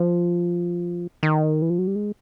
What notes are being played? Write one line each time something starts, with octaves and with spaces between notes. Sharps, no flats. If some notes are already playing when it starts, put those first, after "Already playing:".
Already playing: F3
D#3
E3
F3
F#3
G3
G#3